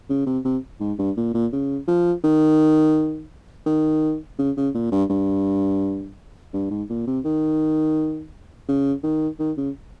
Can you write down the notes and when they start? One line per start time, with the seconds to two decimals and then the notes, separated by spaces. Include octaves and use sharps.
0.09 C#3
0.26 C3
0.45 C3
0.80 G#2
0.99 G2
1.17 A#2
1.34 A#2
1.53 C#3
1.88 F3
2.24 D#3
3.66 D#3
4.38 C#3
4.57 C#3
4.74 A#2
4.91 G2
5.10 G2
6.54 G2
6.70 G#2
6.89 A#2
7.07 C3
7.24 D#3
8.68 C#3
9.03 D#3
9.39 D#3
9.57 C#3